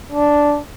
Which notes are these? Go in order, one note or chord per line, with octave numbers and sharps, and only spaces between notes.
D4